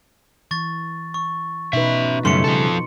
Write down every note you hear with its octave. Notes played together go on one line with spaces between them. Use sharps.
E3 C#6 A6
C#6
B2 C#4 D#4 B4 E5
F#2 C#3 G3 A3 D#4 C6 C#7
F3 A4